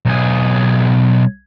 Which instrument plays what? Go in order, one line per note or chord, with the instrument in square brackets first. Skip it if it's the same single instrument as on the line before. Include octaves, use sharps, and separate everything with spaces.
[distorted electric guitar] B1 G#4